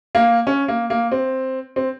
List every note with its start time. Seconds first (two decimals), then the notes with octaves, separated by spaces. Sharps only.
0.15 A#3
0.47 C#4
0.68 A#3
0.90 A#3
1.12 C4
1.76 C4